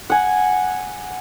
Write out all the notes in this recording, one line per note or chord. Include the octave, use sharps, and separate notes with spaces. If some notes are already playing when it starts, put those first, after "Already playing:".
F#5 G#5